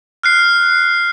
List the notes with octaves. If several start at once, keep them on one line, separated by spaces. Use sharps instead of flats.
F6 F#6 C7